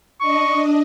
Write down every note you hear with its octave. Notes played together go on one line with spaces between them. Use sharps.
D4 D#5 C#6